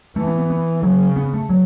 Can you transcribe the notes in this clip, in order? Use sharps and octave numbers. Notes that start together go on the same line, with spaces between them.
E3 A3
B3
B3
B3
C#3 F#3
B3
A3
F#3